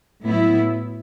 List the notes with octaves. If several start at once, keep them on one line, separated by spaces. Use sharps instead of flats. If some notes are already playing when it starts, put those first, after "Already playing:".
A2 F#3 B3 E4